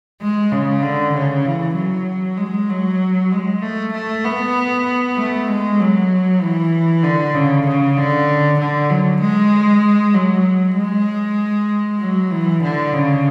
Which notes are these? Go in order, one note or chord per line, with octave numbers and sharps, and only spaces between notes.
G#3
C#3
D3
C#3
E3
F#3
G#3
F#3
G#3
A3
A3
B3
A3
G#3
F#3
E3
D3
C#3
C#3
D3
D3
F#3
G#3
F#3
G#3
F#3
E3
D3
C#3